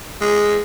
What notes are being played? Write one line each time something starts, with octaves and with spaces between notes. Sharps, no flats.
G#3